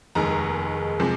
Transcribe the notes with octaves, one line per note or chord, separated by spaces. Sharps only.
F1 D#2 D#3 G#3 A#5
C3 F3 G#3